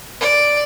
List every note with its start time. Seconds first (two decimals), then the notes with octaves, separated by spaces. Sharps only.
0.21 D5